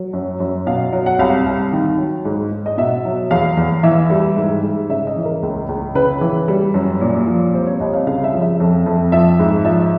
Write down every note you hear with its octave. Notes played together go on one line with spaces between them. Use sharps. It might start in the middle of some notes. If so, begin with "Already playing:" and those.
Already playing: F#3
F#2
F#2
B2 F5
F#3
F#5
C2 F5
C2
D#3
F#3
G#2
G#2
D#5
B2 E5
F#3
E2 F5
E2
E3 E5
G3
G#2
G#2
C#3 E5
D#5
E3
A#4
C#2
C#2
C#3 B4
E3
G3
F#2
A#2
F3
C2 C5
C#5
C2 D#5
F5
C#3 F5
E5
F3
E5
F2
F2
F3 E5
G#2
F3 E5